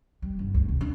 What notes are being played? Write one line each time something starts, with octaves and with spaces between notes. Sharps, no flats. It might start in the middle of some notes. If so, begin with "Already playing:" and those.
G3
G1
D2
C3
D4